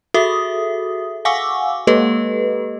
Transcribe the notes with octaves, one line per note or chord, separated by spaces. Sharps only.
F#4 G#4 A4 E5 D#6
F5 F#5 G#5 C#6 D6 E6
G#3 A#3 G4 A4 B4 D#5